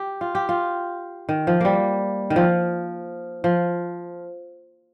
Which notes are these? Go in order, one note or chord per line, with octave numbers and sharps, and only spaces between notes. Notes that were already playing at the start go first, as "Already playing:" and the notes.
Already playing: G4
F4
G4
F4
D#3
F3
G3 A#3
D#3
F3
F3